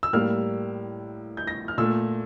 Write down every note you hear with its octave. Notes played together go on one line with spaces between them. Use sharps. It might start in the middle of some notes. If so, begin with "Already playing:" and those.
E6
A2 G3 A#3 F6
G6
A#6
F6
A#2 A3 E6